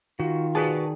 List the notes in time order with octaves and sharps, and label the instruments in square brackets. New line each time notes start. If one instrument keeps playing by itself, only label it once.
[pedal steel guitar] D#3 [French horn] F4 [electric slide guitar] F#4
[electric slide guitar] F#4 B4 A5 [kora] G#4 D5